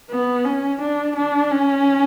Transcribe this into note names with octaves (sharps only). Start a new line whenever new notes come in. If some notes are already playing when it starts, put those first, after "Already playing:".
B3
C#4
D4
D4
C#4